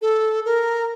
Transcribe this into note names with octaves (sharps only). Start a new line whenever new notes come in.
A4
A#4